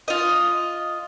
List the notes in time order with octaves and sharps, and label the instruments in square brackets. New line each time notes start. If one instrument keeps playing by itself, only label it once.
[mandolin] F4 D#5